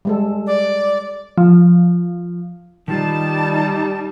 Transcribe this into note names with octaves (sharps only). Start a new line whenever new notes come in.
G3 G#3 A4
D5
F3
D#3 G3 D#4 F4 A5